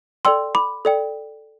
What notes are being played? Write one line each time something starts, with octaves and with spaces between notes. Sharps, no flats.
A4 D5 G5 C6 E6
B5 D6
A4 D5 G5